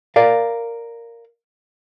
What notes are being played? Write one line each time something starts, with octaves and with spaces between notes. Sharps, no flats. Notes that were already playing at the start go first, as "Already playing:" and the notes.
A#4 D5 F5